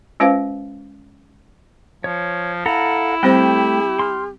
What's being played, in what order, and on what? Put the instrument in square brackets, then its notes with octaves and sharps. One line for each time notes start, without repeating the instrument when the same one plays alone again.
[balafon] G#3 C#4 F4 B4 C5 F5
[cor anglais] F3 [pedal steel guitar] C#5
[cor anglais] E4 [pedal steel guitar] A4 F#5 A#5 [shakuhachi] F5
[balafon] G3 C4 C5 [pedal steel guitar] A3 G5 [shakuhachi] G4
[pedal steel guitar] C6 F6